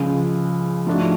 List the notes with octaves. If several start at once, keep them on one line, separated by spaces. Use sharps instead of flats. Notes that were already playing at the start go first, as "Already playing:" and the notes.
Already playing: C#2 C#3 F3 G#3
G#2 F3 A3 D4 F#4